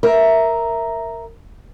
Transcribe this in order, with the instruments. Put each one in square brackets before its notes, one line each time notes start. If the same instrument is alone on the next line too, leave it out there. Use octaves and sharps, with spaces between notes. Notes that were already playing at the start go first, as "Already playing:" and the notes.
[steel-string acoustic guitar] A#4 E5